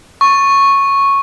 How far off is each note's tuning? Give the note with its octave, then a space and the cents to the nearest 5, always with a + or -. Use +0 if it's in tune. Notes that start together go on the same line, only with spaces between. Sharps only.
C#6 -5